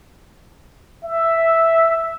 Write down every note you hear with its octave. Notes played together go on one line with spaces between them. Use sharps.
E5